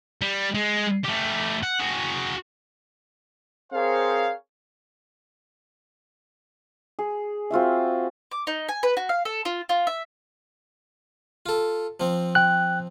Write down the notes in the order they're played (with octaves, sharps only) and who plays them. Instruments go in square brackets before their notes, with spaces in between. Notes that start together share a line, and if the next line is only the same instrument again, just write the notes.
[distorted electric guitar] G3
G#3
A3 G4
F#5
F#4 G#4
[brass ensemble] C4 G#4 A#4 C5 C#5 F5
[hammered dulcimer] G#4
C4 F4 F#4 E5
[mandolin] D6
D#4
G#5
B4
F#4
F5
A4
F4
F4
E5
[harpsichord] F4 A4
F3 C4
[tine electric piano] G5 F#6